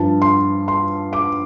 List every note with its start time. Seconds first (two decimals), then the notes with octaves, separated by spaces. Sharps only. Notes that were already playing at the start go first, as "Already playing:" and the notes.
Already playing: G2 F3 A5
0.22 C6
0.68 C6
1.13 D6